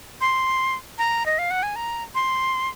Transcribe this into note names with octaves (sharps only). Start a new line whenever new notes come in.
C6
A#5
D#5
F5
F#5
G#5
A#5
C6